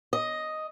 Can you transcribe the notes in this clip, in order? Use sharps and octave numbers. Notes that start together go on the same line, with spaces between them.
D#5